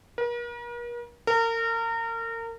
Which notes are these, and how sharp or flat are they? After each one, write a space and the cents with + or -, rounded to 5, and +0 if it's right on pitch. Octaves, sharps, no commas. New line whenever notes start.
A#4 +45
A#4 -30